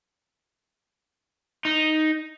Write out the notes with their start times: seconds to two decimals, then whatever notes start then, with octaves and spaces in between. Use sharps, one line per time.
1.65 D#4